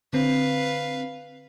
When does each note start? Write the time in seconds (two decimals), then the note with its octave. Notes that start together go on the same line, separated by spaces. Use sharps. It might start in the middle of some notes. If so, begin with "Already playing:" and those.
0.13 D3 C4 B4 F5